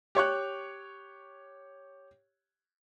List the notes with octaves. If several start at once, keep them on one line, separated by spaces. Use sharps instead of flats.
G4 C#5 C#6 F#6